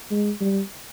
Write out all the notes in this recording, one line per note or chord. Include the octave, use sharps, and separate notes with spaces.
G#3
G3